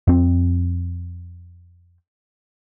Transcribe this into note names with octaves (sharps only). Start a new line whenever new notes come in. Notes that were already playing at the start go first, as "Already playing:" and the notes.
F2 C4